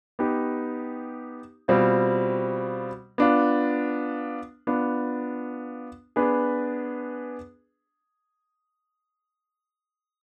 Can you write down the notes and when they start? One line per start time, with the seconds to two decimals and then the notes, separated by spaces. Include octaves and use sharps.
0.19 B3 D#4 G4
1.68 B2 G3 C4 F4
3.18 B3 D4 F4
4.67 B3 D4 F4
6.16 B3 D4 G#4 B4